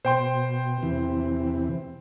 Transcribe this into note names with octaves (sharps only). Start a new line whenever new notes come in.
B2 C5 G5 C6
E2 C3 E3